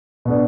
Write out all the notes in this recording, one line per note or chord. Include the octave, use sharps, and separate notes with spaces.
B2 B3 D4